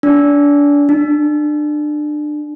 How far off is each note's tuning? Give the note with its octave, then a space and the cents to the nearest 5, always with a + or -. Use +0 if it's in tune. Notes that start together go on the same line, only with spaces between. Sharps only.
D4 -30
D4 +25